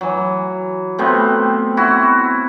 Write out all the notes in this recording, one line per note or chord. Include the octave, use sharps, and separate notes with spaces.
E3 F#3
C3 A3 B3 C4
E4 F#4